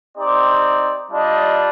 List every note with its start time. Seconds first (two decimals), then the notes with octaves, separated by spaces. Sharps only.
0.17 C4 D#4 G4 D5
1.11 G3 D4 F4 D#5